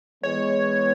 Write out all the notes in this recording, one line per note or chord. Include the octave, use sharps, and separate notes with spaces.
E3 G#3 B3 C#5